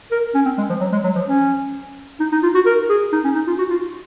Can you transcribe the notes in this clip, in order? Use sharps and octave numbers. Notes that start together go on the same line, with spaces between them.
A#4
C#4
C4
G#3
F3
F#3
G#3
F#3
F3
C#4
D#4
D#4
F4
F#4
A#4
G#4
D#4
C#4
D#4
F4
F#4
F4